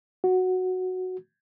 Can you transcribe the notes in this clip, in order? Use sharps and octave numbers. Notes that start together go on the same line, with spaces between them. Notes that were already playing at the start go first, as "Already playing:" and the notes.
F#4